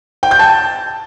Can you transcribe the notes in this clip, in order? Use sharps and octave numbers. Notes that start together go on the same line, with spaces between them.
G5
G6
A5